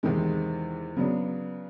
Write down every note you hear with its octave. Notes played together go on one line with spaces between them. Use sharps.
E2 C3 D#3 G#3
C#3 F#3 B3 D4